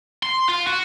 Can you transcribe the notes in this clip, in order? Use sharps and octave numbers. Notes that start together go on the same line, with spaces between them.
C6
F4
F#4